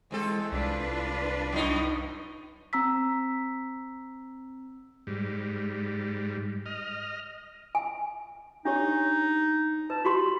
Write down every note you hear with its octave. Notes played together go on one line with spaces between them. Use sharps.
E2 G#3 C4 A4
C2 D4 F4 B4
F#2 A2 D#4
C4 A#5 E6 B6
G#2 G3
D#5 F6
G#5
D4 D#4 G4 C#5
B4 A5
F#4 G4 B5 C6